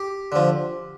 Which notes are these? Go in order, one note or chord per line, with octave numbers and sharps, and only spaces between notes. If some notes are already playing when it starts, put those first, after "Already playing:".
Already playing: G4
D3 F3